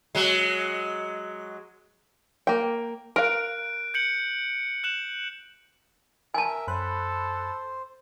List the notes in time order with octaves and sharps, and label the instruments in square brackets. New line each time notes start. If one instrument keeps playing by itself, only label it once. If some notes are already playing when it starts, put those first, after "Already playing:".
[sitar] F#3 G#3
[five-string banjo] A#3 G5
[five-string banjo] A#4 F5 [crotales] F#6 D7
[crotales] G6 C#7 F#7
F#6 E7 F#7
[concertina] A#4 E5 [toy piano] G#5 A5
[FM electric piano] F#2 B5 F#6 [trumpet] A4 [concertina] C5